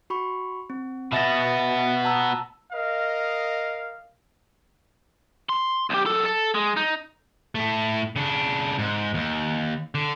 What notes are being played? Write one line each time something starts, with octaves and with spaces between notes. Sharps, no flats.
F#4 B5 C#6
C4
B2 B3 E5 A6 A#6
A5 A#5 E6
A#4 D#5 F5
C6
B1 G4
F#2 A4
A4
G#3
D#4
A2 A3
C#3 D4
G#2
D#2
D3